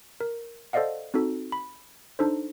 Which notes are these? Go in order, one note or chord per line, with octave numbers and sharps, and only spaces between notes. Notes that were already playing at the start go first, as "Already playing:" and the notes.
A#4
A4 C5 D5 D#5 F5 F#5
C4 D#4 F#4 A4
B5
D4 D#4 A4 C5